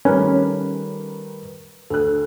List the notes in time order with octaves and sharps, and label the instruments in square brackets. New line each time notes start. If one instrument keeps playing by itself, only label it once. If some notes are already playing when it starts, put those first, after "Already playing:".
[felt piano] D#3 G3 A3 [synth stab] C#4 [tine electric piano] A#4 B4
[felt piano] D2 F#6 [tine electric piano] A4